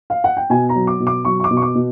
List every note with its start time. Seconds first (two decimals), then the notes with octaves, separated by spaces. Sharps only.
0.10 F5
0.24 F#5
0.37 G5
0.50 B2 G#5
0.69 A#5
0.75 F#3
0.87 D6
1.00 B2
1.07 D6
1.25 F#3 C#6
1.40 C#6
1.44 D6
1.51 B2
1.57 C#6
1.62 D6
1.75 B2